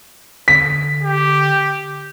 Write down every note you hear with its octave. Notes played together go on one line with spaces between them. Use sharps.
D3 B6
G4